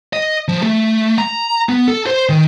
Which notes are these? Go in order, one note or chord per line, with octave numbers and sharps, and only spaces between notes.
D#5
F3
A3
A#5
B3
A4
C5
D#3